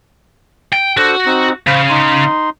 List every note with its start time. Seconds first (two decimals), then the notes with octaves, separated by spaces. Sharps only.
0.73 G5
0.97 D4 F#4 A4 C5
1.26 C4 D#4
1.67 C#3 C5 F5 B5
1.89 D#4 C6